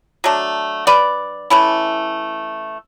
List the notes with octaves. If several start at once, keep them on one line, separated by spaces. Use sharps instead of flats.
F#3 A3 D4
B4 D5
E3 A3 C#4 E4